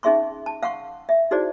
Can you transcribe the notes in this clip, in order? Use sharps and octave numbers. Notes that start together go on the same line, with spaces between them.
C#4 D#4 G#4 E5 C6 C#6
A5
F5 F#5 C6 C#6
E5
D#4 E4 F#4 G#4 C5 D5